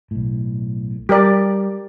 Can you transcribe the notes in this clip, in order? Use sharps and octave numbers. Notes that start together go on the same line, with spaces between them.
B1 A2
G3 G4 A#4 D5